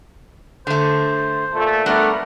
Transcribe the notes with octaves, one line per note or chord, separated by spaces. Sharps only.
D3 A3 C5
A#2 A3
G3 A3 B3 D4 A#4 F#5